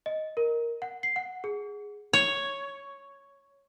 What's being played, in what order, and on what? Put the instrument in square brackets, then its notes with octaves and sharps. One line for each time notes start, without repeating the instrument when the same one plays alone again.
[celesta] D#5
A#4
F#5
C7
F#5
G#4
[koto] C#5